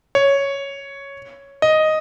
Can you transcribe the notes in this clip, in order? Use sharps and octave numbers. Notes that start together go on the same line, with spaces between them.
C#5
D#5